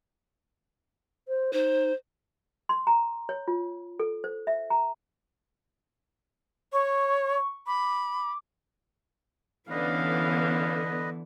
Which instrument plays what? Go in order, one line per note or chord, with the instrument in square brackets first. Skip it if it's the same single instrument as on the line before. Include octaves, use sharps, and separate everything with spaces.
[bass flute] C5
[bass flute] D#4 [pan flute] C5
[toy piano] C6
A#5
C#5
F4
A4
C5
E5
A#5
[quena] C#5 [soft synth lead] C#6
[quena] B5 [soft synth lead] D6
[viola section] D3 B3 [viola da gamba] E3 [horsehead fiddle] C#4 F5 [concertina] B4 D#5